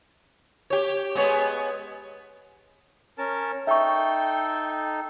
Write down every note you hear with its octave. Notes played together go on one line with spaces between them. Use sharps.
G4 C#5
G#3 B3 C#5
C#4 A#4 A5
D#4 A4 E5 G5 C#6